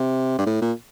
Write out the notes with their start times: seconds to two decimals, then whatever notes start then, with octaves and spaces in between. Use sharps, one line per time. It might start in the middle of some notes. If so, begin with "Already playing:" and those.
Already playing: C3
0.38 G2
0.46 A2
0.61 A#2